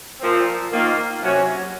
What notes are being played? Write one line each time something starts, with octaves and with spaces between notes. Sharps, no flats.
A#2 F3 C4
D#3 A#3 F4
C3 F#3 C#4